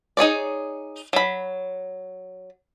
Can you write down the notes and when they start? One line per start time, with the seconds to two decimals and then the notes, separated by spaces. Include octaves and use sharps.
0.17 D#4 G#4 C#5 D5
1.13 F#3 B5